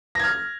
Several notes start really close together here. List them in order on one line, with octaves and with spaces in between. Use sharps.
A#6 G#6 F6